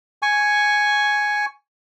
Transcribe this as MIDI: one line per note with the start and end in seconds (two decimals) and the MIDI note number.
0.22 1.46 80
0.22 1.46 85